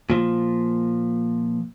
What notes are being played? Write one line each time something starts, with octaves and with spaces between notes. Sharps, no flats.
A#2 F3